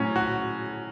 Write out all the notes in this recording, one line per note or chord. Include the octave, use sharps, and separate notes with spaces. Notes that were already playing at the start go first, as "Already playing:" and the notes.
Already playing: A2 F#3 C#4
F#4